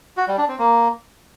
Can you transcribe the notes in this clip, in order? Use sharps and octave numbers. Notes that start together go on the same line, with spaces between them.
F#4
G3
D4
C4
A#3